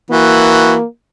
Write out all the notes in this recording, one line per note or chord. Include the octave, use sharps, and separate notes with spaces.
E3 A#3 F#4